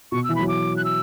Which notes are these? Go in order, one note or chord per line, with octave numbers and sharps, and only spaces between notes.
B2 C#6
E3 E6
F#3 B5
D6
F#6
E6